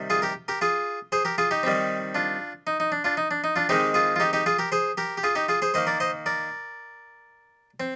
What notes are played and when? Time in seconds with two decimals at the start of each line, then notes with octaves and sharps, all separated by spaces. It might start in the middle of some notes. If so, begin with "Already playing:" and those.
Already playing: C3 D#3 G3
0.10 F4 G#4
0.22 G4 A#4
0.48 G4 A#4
0.61 F4 G#4
1.12 G#4 C5
1.25 G4 A#4
1.38 F4 G#4
1.51 D#4 G4
1.63 D#3 G3 C4
2.15 D4 F4
2.67 D#4
2.80 D#4
2.92 D4
3.04 D4 F4
3.17 D#4
3.31 D4
3.44 D#4
3.56 D4 F4
3.69 D#3 G#3 C4 D#4 G4
3.94 F4 G#4
4.16 F4
4.20 D#4 G4
4.33 D#4 G4
4.46 F4 G#4
4.59 G4 A#4
4.72 G#4 C5
4.97 G4 A#4
5.17 G4
5.23 F4 G#4
5.35 D#4 G4
5.48 F4 G#4
5.62 G#4 C5
5.74 D#3 A#3 C5 D#5
5.87 A#4 D5
6.00 C5 D#5
6.26 A#4 D5
7.80 C4